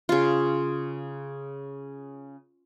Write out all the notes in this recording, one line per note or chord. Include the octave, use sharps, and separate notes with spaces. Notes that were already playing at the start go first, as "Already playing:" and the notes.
C#3 F4